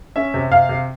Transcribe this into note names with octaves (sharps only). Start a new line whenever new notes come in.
C#4 E5
C3
C3 F5
C3